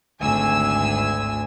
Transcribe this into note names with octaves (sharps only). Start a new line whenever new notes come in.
G#1 D2 G#5 E6